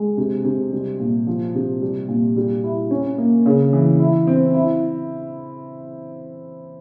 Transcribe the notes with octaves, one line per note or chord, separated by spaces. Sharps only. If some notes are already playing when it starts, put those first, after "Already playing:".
Already playing: G#3
C3
C3
G3
A#2
F3
C3
G3
A#2
G3
E4
C#4
A#3
C#3
E3
E4
C4
E4